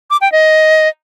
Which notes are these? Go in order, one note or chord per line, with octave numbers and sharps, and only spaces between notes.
D6
G5
D#5